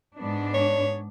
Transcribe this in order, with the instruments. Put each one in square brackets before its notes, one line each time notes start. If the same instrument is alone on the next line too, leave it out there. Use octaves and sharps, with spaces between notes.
[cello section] G#2 B3 D4
[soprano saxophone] C#5